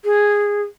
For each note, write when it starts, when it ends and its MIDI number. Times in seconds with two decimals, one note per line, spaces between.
0.05 0.63 68